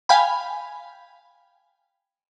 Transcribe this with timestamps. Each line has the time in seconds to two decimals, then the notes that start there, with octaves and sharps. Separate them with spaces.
0.09 F5 G5 G#5 B5